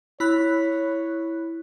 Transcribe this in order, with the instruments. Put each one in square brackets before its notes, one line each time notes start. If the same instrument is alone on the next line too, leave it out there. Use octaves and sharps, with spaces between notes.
[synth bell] E4 B5 F#6 [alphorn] C#5